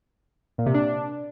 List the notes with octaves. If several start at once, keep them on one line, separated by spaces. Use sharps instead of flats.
A#2
C3
D4